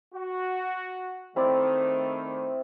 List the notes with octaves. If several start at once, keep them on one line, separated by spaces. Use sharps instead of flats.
F#4
D#3 A3 C4 E4 D5